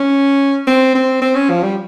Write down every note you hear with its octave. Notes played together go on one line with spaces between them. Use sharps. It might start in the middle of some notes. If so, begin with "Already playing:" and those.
Already playing: C#4
C4
C4
C4
C#4
F3
G3